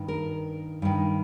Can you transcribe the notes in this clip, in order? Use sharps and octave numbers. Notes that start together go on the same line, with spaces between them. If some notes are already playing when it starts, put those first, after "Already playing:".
Already playing: G2 D#3
A#4
G2 D#3